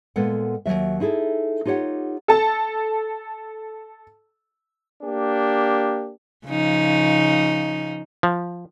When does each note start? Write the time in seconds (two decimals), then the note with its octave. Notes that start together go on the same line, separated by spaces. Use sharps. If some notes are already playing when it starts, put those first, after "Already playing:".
0.16 A#2 G#3 B3 A4 F#5
0.66 D#2 B2 F#3 E5
1.00 D#4 E4 G#4 A4
1.65 D#4 F4 G4 C#5 F#5
2.28 A4 A5
5.03 A#3 D4 G4
6.47 C#3 F3 D#4
8.23 F3